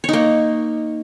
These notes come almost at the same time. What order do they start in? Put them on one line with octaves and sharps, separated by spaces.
C#5 D#4 A#3